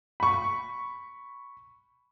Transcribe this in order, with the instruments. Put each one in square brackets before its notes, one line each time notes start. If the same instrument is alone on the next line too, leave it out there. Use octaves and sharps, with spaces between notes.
[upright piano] B5 C#6